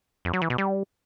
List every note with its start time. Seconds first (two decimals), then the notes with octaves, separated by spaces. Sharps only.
0.25 F2
0.33 F#3
0.42 E3
0.50 B2
0.58 G3